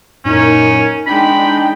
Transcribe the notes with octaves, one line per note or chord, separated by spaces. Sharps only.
F#2 A#2 C#4 D#4 A#4
G#3 D4 D#4 G5 B5